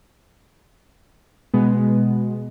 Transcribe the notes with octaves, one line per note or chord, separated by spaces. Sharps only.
B2 G#3 B3